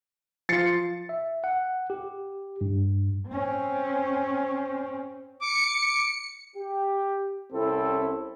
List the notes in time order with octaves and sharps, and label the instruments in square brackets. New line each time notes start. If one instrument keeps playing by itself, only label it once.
[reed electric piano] F3 F4 [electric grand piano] A6 C7 C#7
[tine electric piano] E5
F#5
G4
G2
[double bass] C4 C#4
[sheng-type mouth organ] D6 [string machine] C#7
[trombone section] G4
C2 C4 C#4 E4 A4